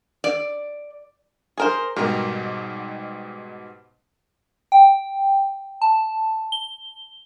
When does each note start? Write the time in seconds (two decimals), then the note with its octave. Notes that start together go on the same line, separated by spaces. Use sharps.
0.24 D5
1.57 G#4 A#4 C5
1.96 G#2 B2 G3 A#4
4.72 G5
5.82 A5
6.52 G7